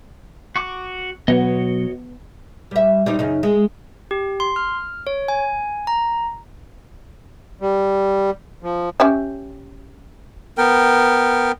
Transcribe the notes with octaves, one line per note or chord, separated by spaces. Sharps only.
F#4 C#6 D6
B2 F#3 B3 F#4 C#5 D#5
G3 E5
G3 C4 D#4
F#2 C#3 D#4
G#3
G4
C6
F6
C#5
G#5
A#5
G3
F3
C#4 G4 E5
B3 A#4 G5